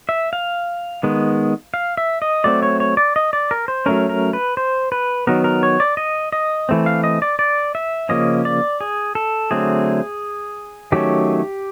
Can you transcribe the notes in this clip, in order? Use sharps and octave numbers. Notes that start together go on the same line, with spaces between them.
E5
F5
D#3 G#3 B3
F5
E5
D#5
F#3 A3 C4 D5
C#5
C#5
D5
D#5
D5
A#4
C5
F#3 A3 C#4 A#4
A#4
B4
C5
B4
D#3 F#3 B3 A#4
A#4
C#5
D5
D#5
D#5
E3 A3 C4
F5
D#5
D5
D5
E5
C#3 F3 A#3 C#4 D#5
D5
G#4
A4
D3 F#3 A3 C4 G#4
D#3 F#3 A3 C#4 G4